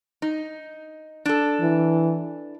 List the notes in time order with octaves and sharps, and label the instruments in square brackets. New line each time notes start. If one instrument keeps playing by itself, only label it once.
[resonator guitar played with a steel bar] D#4
D4 A4
[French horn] E3